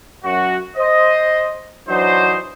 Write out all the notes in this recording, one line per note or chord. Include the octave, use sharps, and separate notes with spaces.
F#2 F#4
C5 D#5
E3 F#3 D4 D#4 C5